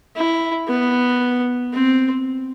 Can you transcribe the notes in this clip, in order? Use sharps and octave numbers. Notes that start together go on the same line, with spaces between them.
E4
B3
C4